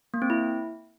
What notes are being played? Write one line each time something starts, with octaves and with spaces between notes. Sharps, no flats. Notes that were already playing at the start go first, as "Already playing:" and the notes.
A#3
C4
E4